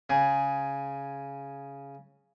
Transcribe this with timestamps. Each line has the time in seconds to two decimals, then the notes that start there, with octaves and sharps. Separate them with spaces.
0.10 C#3 G#4